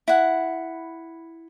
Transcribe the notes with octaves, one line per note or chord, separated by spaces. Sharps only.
E4 F#5